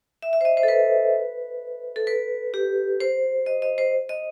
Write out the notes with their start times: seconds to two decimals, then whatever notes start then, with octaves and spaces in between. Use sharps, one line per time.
0.22 E5
0.33 E5
0.41 C5
0.45 D#5
0.57 C5
0.63 A4
0.68 B4
1.96 A4
2.07 B4
2.54 G4
3.01 C5
3.46 D#5
3.62 D#5
3.78 C5
4.09 D#5